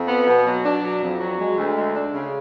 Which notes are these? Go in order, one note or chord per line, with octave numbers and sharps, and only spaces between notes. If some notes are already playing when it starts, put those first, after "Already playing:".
Already playing: F2
B3
B2
F#3
D4
F#3
F2
F#3
G#3
D2
G#3
D4
C#3